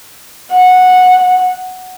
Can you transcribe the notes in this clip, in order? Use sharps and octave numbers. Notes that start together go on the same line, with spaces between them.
F#5